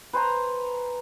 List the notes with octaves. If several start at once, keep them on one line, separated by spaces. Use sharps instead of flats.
B4 C5 G#5 A#5